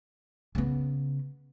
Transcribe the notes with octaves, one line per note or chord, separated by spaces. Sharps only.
C#3 B3